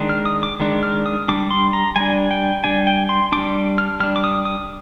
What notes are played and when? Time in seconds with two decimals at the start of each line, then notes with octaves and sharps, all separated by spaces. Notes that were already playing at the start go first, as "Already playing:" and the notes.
Already playing: D#3 G#3 D4
0.09 F6
0.25 D#6
0.43 D6
0.60 D#3 G#3 D4
0.83 F6
1.06 D#6
1.28 G3 D4 D6
1.51 C6
1.73 A#5
1.96 G3 D4 G#5
2.31 G5
2.64 G3 D4 G#5
2.87 G5
3.09 C6
3.32 G3 D4 D6
3.78 F6
4.00 G3 D4 F6
4.16 D6
4.24 D#6
4.45 D#6